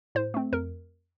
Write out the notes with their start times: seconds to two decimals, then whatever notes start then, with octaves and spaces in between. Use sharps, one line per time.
0.15 A2 C5
0.34 A3 C4
0.52 F2 A#4